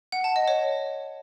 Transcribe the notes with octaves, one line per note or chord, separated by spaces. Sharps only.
F#5
A5
D#5
C#5